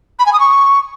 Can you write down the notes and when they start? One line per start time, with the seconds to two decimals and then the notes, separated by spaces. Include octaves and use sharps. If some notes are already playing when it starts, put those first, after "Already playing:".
0.19 B5
0.26 G#5
0.33 D#6
0.40 C#6